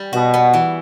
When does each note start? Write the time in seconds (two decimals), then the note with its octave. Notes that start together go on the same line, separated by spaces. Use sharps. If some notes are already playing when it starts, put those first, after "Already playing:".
Already playing: G3
0.13 B2 F#4
0.34 B3
0.53 E3